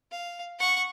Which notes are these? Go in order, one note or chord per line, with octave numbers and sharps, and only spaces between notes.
F5
F#5 C#6